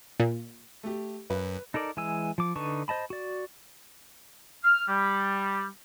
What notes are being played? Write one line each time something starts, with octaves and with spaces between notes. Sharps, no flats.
A#2
A3 G4
F#2 B4
D#4 A4 A#4 D5
E3 G#3 G#5 E6
F3 D6
D3 D#4 B4 A5 C#6
C5 D#5 A5 B5
F#4 D5
F6
G3